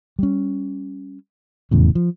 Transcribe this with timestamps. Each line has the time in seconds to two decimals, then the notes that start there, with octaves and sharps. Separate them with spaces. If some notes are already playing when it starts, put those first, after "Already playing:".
0.19 G3 C#4
1.71 F1 E2 A2 C#3
1.95 F3